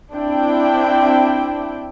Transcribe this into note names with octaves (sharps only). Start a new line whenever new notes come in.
C4 D4 E4 G5